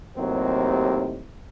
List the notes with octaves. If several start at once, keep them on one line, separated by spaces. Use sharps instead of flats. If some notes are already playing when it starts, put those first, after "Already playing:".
D#2 A2 C3 D#3 F#3 C4